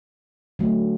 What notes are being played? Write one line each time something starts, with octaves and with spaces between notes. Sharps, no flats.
D3 F#3 A3